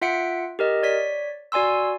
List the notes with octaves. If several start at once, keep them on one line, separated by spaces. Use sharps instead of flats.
F4 E5 F#5 B6 C#7 D7
G4 A#4 D#5
C#5 D5 B6
F#4 D5 G#5 C6 E6